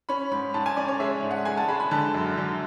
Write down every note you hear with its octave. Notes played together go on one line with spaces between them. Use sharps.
C#4 B5
G#2 B5
G#2 A5
G#5
C#4 D5
C#5
G#3 E5
G#2
F#5
G#3 G#5
A5
G#3 B5
B5
D3 A5
F#2
D3